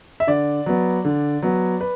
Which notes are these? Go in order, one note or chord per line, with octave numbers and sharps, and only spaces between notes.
E5
D3 D5
F#3 B3
D3
F#3 B3
B4